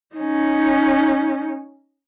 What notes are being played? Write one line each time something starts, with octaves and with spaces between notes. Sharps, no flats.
C#4 D#4